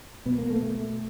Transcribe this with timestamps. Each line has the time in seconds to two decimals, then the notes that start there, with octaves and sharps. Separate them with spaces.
0.26 B2 B3
0.38 A#3
0.50 A3
0.63 A3